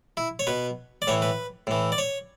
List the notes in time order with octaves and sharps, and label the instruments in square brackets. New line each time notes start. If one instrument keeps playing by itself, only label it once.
[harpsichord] E4
C#5
B2 B4
D5
A2 E3 C#5
B4
A2 E3
D5
C#5